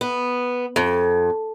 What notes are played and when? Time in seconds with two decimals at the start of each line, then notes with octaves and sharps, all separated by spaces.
0.01 B3
0.76 F2